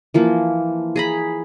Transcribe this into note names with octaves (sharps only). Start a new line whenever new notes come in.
E3 F3 A#3
G#4 A#5 B5